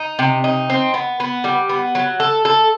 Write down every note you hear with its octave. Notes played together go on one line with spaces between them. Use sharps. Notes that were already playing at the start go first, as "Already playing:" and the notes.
Already playing: D#4
C3
D#4
C4
B3
B3
G3
B3
F#3
A4
A4